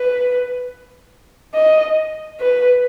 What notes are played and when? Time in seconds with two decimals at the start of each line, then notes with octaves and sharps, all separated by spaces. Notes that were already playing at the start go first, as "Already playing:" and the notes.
Already playing: B4
1.55 D#5
2.40 B4